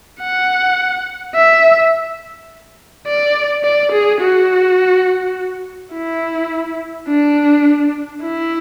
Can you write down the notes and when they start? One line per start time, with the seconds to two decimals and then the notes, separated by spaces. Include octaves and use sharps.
0.21 F#5
1.35 E5
3.07 D5
3.64 D5
3.92 G#4
4.21 F#4
5.93 E4
7.08 D4
8.22 E4